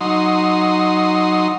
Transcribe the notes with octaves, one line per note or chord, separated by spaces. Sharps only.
F#3 D#4 C6